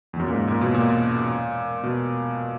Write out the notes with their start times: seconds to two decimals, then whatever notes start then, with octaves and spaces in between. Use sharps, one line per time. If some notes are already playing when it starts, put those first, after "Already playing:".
0.13 E2
0.20 F#2
0.27 A#2
0.33 G#2
0.47 A#2
0.61 B2
0.74 A#2
1.83 B2